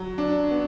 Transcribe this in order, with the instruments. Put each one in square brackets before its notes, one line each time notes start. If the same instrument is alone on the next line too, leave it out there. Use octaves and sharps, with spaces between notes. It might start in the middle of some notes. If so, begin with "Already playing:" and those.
Already playing: [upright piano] F#3
D4
B3